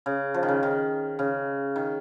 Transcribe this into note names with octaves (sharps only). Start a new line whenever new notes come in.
C#3
F3
D#3
C#3
D#3
C#3
D#3